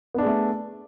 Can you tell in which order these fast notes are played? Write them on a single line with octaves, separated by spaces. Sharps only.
B3 D4 G#4 A3